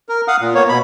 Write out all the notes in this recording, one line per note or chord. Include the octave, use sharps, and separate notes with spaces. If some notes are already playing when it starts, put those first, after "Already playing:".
A#4
F5 F#5 D#6
A#2
A#3 B3 C#5
B2 B5